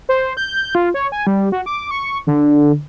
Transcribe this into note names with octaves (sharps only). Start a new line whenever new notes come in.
C5
G6
F4
C#5
G#5
G3
F#4
D6
C#6
D3